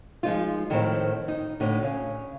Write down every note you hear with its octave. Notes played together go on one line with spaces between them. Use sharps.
F3 G#3 D#4 F4
A2 D#3 F3 C4 E4
D#4
A2 D3
C#3